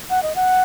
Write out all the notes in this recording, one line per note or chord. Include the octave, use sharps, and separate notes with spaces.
F#5
D#5
F#5